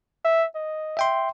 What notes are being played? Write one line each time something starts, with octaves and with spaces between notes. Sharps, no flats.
E5
D#5
E5 G5 C6